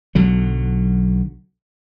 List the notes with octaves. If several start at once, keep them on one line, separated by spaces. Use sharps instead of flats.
B1 D3 F#3